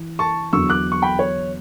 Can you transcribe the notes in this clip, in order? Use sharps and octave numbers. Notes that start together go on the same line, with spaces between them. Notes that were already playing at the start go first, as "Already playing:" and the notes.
Already playing: E3
A5 C#6
E2 D3 F#3 C#6 E6
D6 F#6
C#6
G5 B5
C#5